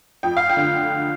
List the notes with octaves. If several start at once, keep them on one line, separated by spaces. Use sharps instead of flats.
F2 G5
F5
G5
D3